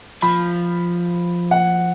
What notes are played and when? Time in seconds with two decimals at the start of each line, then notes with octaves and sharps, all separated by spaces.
0.22 F3 B5
1.51 F#5